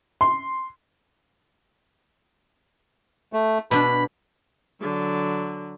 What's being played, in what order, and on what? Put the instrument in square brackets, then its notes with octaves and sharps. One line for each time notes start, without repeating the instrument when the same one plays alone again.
[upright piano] C6
[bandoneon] A3
[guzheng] B2 D4 [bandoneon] B5
[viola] D3 F#3